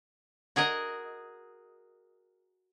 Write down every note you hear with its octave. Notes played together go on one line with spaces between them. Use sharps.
F#4 G#4 A#4 D#5